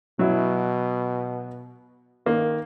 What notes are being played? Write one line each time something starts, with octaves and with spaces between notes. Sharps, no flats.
B2 F#3 E4
D#3 A#3